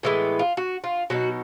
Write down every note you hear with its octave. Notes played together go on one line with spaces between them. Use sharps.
A2 E3 G#3 B3
F4
F#4
F4
B2 F#3 B3 D#4 F#4